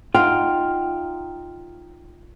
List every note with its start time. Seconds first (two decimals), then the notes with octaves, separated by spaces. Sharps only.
0.14 D#4 F4 F#5 G5 C6 F6